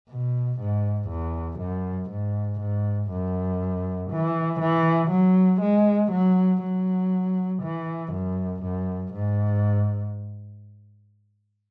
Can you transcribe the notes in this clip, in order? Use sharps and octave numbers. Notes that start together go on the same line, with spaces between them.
B2
G#2
E2
F#2
G#2
G#2
F#2
E3
E3
F#3
G#3
F#3
F#3
E3
F#2
F#2
G#2